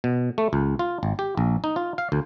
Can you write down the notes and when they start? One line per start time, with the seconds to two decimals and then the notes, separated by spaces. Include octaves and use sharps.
0.04 B2
0.38 A3
0.53 C#2
0.79 F4
1.03 G#1
1.19 G4
1.37 A#1
1.64 D#4
1.76 F4
1.98 F5
2.12 D2